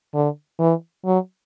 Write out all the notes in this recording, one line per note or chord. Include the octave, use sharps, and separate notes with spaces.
D3
E3
F#3